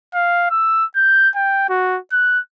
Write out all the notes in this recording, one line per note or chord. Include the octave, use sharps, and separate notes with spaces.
F5
E6
G6
G5
F#4
F#6